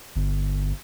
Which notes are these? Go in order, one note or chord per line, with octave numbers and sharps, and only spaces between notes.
G1